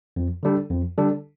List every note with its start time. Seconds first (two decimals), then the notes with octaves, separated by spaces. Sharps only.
0.16 F2
0.43 D3 G3 D4 A4
0.71 F2
0.98 D3 G3 D4 A4